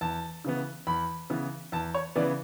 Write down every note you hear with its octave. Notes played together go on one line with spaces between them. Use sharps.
E2 A5
C#3 E3 B3
E2 B5
C#3 E3 B3
E2 A5
C#5
C#3 E3 B3 D5